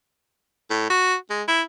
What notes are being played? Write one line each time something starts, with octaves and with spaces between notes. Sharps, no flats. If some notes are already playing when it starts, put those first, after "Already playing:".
A2
F#4
G#3
E4